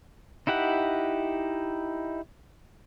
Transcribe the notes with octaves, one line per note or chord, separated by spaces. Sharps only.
D#4 E4 G4 F#5